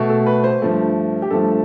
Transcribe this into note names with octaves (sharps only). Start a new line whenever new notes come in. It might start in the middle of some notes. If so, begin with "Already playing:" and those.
Already playing: B2 A3
A4
B4
C5
G2 F3 A3
G4
G2 F3 A3 A4